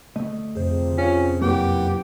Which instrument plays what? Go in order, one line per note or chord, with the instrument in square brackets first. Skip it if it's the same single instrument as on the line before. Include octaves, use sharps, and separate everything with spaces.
[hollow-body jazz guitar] D2 A3 D#5
[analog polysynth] F2 C3 [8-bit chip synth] G#4 C5
[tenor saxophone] C#4 [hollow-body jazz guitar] F4
[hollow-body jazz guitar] F#2 A#3 [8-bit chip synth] E4 B4 F#5 [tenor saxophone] G4